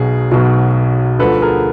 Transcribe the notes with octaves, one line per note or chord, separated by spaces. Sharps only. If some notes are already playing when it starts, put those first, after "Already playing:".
Already playing: B1 B2 F#3 G#4
B1 B2 F#3
D2 D3 F3 A4 B4
G#4 A#4